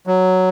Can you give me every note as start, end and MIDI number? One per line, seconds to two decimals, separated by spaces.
0.07 0.49 54